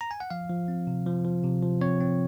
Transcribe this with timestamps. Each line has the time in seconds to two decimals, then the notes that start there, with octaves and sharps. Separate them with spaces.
0.01 A#5
0.11 G#5
0.20 F#5
0.30 F3 F5
0.49 F3
0.68 C4
0.87 C3
1.06 F3
1.25 F3
1.44 C3
1.62 F3
1.81 C4 C#5
2.01 C4